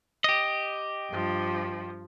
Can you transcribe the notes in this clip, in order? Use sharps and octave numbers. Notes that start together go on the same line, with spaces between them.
G4 D#5
G2 F3